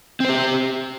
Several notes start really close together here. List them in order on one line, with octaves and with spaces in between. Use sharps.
C4 C5 G4